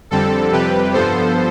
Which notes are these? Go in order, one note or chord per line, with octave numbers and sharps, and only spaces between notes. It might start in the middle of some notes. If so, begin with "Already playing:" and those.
F2 D3 G3 C4 A4
F2 C3 G3 G4 B4
G2 F3 B3 A4 C5